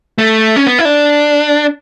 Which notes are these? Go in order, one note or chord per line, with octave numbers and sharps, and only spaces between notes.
A3
C#4
B3
E4
D4